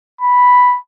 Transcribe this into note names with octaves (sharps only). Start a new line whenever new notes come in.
B5